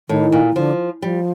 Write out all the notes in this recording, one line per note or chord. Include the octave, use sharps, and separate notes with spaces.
A2 D#3
A#2
D#3
D3 F3
F3 G3